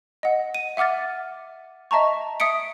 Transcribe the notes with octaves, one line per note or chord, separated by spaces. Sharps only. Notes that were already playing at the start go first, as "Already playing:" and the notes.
D#5 F#5
D#7
E5 F#5 D6 F6 A6
D#5 E5 A5 A#5 C#6
E5 D#6 B6 C#7 D7